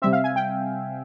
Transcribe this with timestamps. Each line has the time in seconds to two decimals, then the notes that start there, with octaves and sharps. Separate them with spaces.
0.02 C3 G3 C4 E5
0.13 F5
0.24 G#5
0.36 G5